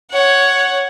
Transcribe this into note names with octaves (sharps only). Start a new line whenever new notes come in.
C#5 F#5